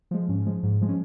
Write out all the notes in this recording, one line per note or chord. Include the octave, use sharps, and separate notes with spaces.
F3 G#3
G#2 C#4
F3 G#3
G#2
F3 G#3
C#4